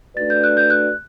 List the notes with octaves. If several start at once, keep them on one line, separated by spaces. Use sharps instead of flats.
A3 D4 F#4 B4 D5 A6
G6
F#6
G6
F#6